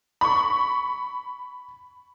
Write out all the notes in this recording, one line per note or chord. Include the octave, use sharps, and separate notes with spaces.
B5 C#6